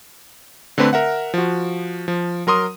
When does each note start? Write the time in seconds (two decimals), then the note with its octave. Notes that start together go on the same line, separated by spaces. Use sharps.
0.78 D3 A3 C4 B4
0.93 A#4 E5 F#5
1.34 F3 F#4
2.08 F3
2.47 F#3 A#4 C6 D#6